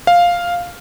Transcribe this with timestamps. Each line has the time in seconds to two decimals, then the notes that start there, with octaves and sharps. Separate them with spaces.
0.07 F5